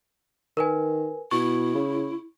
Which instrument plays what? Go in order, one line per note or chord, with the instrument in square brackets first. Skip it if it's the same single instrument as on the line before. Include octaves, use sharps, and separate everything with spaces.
[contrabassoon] D#3 [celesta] A#4 B4 G#5
[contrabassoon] B2 [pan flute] E4 [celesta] C#6
[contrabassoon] C#3